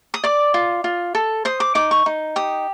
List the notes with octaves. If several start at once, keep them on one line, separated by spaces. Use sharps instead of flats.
D#6
D5 D6
F4
F4
A4
C5 D#6
D6
D#4 D6
C#6
D#4
G4 D#6